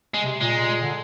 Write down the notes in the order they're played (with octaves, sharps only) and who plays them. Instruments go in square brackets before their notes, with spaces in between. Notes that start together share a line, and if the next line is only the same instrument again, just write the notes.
[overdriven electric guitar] G#3
[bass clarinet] C3
[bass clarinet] A#2 [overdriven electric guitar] G#3
[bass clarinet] D3